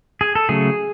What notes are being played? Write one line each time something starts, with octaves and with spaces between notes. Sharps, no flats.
G#4
A4
C#3 F#3 A3 G#4